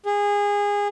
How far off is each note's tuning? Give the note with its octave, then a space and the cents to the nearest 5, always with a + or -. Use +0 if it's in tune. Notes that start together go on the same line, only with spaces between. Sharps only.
G#4 -25